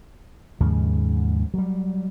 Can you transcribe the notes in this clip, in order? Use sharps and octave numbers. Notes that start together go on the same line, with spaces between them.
D#2 G#2 C#3 F3
F#3 G3